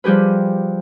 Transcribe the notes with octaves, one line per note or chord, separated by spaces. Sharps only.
F3 G3 G4 G#4 B4